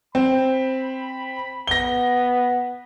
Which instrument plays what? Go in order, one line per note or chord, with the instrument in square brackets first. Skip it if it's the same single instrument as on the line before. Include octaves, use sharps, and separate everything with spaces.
[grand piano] C4 [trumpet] B5
[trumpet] B3 [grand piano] A#6 G7